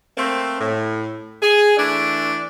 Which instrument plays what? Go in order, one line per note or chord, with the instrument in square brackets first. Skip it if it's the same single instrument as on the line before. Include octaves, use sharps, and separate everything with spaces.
[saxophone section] A3 A#3 C4
A2
G#4
E3 A3 D4